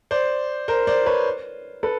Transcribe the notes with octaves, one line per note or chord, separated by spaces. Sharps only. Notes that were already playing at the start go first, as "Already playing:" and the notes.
C5 D5
A#4 C5
C5 D5
B4 C#5
A4 B4